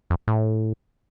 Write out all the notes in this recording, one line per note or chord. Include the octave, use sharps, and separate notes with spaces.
F2
A2